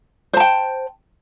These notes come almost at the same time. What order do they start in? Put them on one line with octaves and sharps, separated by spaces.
C5 A5 G5